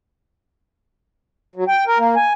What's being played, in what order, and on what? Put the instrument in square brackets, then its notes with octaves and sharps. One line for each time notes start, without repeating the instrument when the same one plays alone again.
[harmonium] F#3
G5
A#4
A#3
G#5